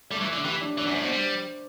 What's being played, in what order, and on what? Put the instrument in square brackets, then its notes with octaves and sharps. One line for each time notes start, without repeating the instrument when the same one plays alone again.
[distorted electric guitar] G3 [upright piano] A3
[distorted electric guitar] E3
[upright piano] A3
[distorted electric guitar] D3
[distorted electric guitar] E3 [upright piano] G4
[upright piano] D4
[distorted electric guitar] E3 [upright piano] D4
[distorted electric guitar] F#2
[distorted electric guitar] A2 [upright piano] C5
[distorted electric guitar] B2
[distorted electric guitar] G3 [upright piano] C5